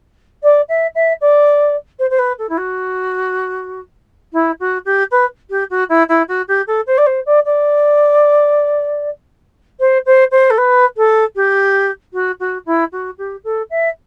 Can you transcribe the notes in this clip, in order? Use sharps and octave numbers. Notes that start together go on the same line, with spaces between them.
D5
E5
E5
D5
C5
C5
B4
A4
E4
F#4
E4
F#4
G4
B4
G4
F#4
E4
E4
F#4
G4
A4
C5
D5
C5
D5
D5
C5
C5
C5
A4
B4
A4
G4
F#4
F#4
E4
F#4
G4
A4
E5